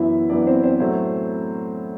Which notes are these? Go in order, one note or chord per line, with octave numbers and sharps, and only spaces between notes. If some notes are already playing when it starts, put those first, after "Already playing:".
Already playing: F#2 E3 B3 E4 E5
F#2 E3 B3 D4 D5
C4 C5
C4 C5
A2 F#3 A3 C4 C5